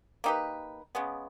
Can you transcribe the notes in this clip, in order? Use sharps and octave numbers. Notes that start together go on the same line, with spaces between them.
A#3 D#4 G4 B4
C#3 G#3 B3